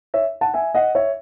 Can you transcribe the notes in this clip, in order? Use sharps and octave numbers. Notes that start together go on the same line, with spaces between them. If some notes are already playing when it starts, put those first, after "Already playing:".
C#5 E5
F#5 A5
E5 G#5
D#5 F#5
C#5 E5